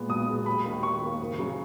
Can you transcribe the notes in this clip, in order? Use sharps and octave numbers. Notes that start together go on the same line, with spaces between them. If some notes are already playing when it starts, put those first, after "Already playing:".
Already playing: A#2 G#3 B3
B1 D#6
A#2 G#3 B3
D#2 B5
D#3 A#3
D#2 C#6
D#3 A#3
F#1
C#3 F#3